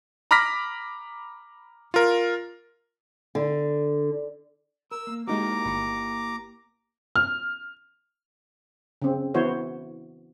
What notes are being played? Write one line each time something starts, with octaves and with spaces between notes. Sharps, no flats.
A#5 B5 D6 F6 A#6 B6
F4 A#4
D3
A#4 E6
A#3
G#3 A#3 D#4 E4 F#4 G4 A#5 D6
G1 B5 C#7
F6
C#3 C4
E3 B3 E4 F#4 C5 C#5